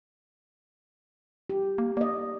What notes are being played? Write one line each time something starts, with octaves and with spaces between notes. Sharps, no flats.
G4
A#3
A#3 D5 D#5